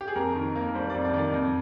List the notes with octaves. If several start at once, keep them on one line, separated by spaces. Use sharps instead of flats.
G4
G#4
F2 A#4
D#3
A#3
G3 C5
D5
F2
D5
D#3
D5
F2